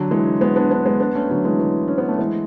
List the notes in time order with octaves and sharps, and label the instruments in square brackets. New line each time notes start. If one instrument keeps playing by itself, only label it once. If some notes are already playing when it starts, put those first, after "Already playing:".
Already playing: [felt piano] D3 F#3
E3 G#3
G#3 B3
B3 D4
B3 D4
G#3 B3
B3 D4
A3 C#4
D3 F#3
E3 G#3
E3
C#4
B3
A3
E3 G#3